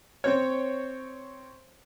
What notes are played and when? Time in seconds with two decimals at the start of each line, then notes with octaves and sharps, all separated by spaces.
0.24 C4 C#5